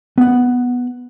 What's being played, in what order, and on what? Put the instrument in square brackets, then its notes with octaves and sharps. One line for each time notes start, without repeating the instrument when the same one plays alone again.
[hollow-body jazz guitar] B3 F#5